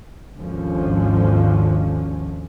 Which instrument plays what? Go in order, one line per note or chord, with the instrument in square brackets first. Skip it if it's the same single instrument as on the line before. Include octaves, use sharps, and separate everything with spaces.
[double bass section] G#1 D#2 D3 F3 C#4